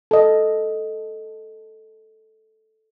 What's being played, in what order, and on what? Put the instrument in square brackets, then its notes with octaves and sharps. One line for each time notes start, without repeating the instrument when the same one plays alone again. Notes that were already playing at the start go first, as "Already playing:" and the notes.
[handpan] A4 D#5